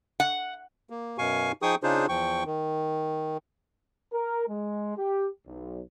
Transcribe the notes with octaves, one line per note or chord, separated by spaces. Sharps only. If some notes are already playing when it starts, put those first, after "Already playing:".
F#5
A#3
F#2 B2 F5 G#5 C#6
F3 D#4 G#4 G5 C#6 D#6
C#3 D4 D#4 F4 G#4 C5
E2 F3 G5 C#6
D#3
A#4
G#3
G4
B1